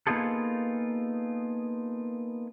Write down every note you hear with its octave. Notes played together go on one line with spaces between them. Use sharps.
A#3 B3 D#4 F4 G#4 A4